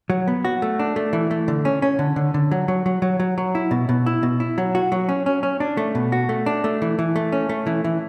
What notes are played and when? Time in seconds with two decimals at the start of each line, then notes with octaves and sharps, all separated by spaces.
0.10 F#3
0.28 B3
0.45 F#4
0.62 A3
0.79 D4
0.96 A3
1.13 E3
1.31 A3
1.48 D3
1.65 C#4
1.82 C#4
1.99 D3
2.16 D3
2.34 D3
2.51 F#3
2.68 F#3
2.86 F#3
3.02 F#3
3.20 F#3
3.38 F#3
3.55 E4
3.71 B2
3.89 B2
4.06 E4
4.23 B2
4.40 E4
4.58 F#3
4.75 F#4
4.92 F#3
5.09 C#4
5.26 C#4
5.43 C#4
5.60 D4
5.77 A3
5.95 B2
6.12 F#4
6.29 A3
6.46 D4
6.64 A3
6.82 E3
6.99 E3
7.16 A3
7.32 C#4
7.49 A3
7.67 E3
7.84 E3